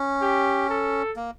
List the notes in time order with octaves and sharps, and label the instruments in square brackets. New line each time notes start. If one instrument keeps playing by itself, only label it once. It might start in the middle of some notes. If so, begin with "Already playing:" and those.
Already playing: [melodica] C#4
[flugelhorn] G4
A4
[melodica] A#3